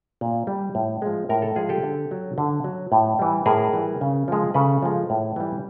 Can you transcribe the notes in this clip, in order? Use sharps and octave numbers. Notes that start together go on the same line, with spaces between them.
A#2
G3
A2
F3 G#3
A2 A#4
A4
F3 G#3 G#4
G4 A4
D3
F#3
D3
F#3
A2
E3 G3
A2 G#4 A#4
E3 G3
C#3
F3 G#3
C#3 A4 B4
F3 G#3
A2
E3 G3